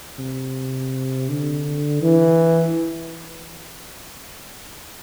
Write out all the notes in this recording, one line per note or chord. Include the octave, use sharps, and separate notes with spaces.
C3
D3
E3